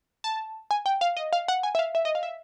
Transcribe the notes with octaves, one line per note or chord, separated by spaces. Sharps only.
A5
G#5
G5
F5
D#5
F5
F#5
G#5
E5
F5
E5
D#5
F5
E5